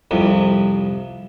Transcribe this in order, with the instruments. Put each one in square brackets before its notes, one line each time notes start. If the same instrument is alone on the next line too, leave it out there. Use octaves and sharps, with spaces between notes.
[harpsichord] C2 F2 C3